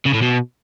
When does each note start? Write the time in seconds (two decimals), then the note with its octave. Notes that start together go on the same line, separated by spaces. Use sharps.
0.05 C#3
0.14 A2
0.22 B2